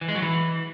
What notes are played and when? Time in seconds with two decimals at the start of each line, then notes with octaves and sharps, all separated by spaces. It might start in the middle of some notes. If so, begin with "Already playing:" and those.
0.01 E3
0.08 G#3
0.15 F#3
0.22 E3